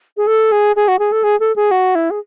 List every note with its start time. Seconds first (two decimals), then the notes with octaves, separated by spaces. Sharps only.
0.17 G#4
0.27 A4
0.52 G#4
0.76 G#4
0.88 F#4
0.99 G#4
1.12 A4
1.24 G#4
1.40 A4
1.56 G#4
1.71 F#4
1.95 E4
2.11 G#4